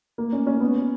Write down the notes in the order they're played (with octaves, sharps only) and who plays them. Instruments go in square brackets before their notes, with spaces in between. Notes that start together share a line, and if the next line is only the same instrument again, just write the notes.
[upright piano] A#3
C#4
C#4
B3